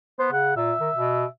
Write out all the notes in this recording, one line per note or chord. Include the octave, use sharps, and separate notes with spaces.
B3 C5
C#3 F#5
A#2 E5
D#3
B2